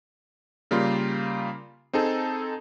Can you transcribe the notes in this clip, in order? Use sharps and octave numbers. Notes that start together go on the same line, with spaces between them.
C#3 G3 A#3 F4 C6
C4 D#4 G#4 A4